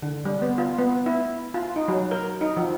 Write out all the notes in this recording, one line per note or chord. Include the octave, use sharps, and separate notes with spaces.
D3
G3
B3
F4
B3
E4
F4
D#4
F#3
A#4
D#4
F3